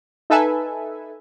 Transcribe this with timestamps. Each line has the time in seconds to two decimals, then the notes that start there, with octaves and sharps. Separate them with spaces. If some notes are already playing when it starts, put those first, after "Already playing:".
0.30 D#4 A4 B4 E5 G#5